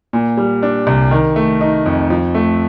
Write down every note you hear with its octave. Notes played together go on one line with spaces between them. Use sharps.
A#2
G3
D4
C2
D#3
A3
D#4
F2
F3
A3